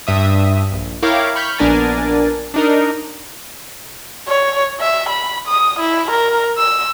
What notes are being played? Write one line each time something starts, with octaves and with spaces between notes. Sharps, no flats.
G2 E5 D#6
A#1
E4 A#4 C#5 F5 G5 D6
B5 C#6 F6 G6 B6
A#1 B3 D4 A#4 G#5 A6
D4 D#4 A#4
C#5
E5
B5
D#6
E4
A#4
E6